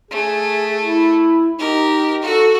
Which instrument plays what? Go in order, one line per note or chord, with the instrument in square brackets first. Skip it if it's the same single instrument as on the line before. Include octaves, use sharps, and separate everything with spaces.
[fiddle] A3 [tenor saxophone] G#4
[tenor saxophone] E4
[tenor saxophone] D#4 [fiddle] G4 A#4
[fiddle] F#4 [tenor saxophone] A4